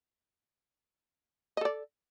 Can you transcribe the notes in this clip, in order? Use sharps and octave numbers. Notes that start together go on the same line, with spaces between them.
A4 D5 D#5